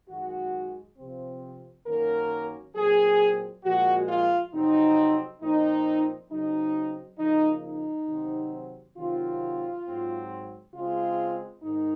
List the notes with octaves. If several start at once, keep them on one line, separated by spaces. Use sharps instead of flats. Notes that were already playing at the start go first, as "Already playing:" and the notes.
F#2 D#3 G#3 F#4
C3 F3 C4
F#2 D#3 F#3 A#3 C#4 A#4
A#2 F#3 C4 G#4
A#2 F3 G#3 F#4
F4
F2 C3 F#3 C4 D#4
A#2 F3 C4 D#4
C#3 F#3 C4 D#4
C#3 F3 A#3 D#4
D#4
C3 D#3 F#3 C4
C3 D#3 F#3 C4 F4
G#2 F#3 C4
C#3 G#3 C4 F4
G#2 D#3 D#4